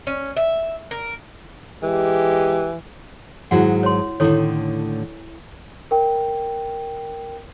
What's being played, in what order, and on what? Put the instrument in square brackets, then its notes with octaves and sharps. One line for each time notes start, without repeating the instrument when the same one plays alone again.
[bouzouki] C#4
E5
A#4
[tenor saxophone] E3 [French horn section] G#3 G4
[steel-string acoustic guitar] G#2 D#3 F#3 [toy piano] E4 F#4 F#5
[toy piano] C#5 C6
[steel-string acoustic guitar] A2 D3 D#3 [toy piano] E4 A4 C#5
[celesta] A#4 G5